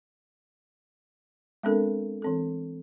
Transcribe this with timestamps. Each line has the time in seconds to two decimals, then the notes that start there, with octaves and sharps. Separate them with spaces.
1.63 G#3 B3 C4 D4 A4 A#4
2.22 E3 C4 A4